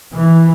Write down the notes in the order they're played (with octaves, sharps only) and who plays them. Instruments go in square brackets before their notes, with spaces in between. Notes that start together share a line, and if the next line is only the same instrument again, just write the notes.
[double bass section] E3